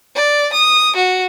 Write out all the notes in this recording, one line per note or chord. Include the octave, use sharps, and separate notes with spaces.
D5
D#6
F#4